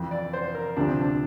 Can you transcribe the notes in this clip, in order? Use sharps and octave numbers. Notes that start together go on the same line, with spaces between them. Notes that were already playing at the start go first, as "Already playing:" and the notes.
Already playing: F2 E3
D5
C5
A#4
D2 C3 F3 D4
C4
D4